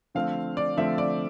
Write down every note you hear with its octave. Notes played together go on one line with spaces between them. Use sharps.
D3 F3 A3 C4 F5
D5
D3 F3 A3 C4 E5
D5